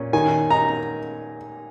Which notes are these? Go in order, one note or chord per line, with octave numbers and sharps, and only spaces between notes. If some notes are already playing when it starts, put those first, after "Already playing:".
Already playing: A#2 C#4
D#3 G#5
D#4 A#5